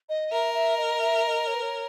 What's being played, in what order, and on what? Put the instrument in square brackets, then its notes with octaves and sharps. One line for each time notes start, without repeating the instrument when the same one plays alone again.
[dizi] D#5
[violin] A#4 [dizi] E5
[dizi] E5
D#5
E5
E5
D#5
C#5
B4
C#5